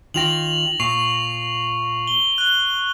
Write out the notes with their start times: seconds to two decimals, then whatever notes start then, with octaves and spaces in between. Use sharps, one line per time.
0.14 D#3 F4 G5 A#6 F7 F#7
0.80 A#2 C#6 C7 F7
2.07 G7
2.38 F#6 G7